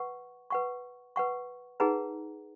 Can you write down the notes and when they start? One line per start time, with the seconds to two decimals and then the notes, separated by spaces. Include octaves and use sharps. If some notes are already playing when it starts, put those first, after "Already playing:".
Already playing: B4 F#5 C#6
0.50 B4 F#5 C#6
1.16 B4 F#5 C#6
1.80 D#4 G#4 B4 F#5 A#5